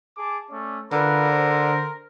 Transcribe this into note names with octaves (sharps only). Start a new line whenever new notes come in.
G#4 A5 D6
A3 C#4 D5
D3 F4 A#4 B4
C5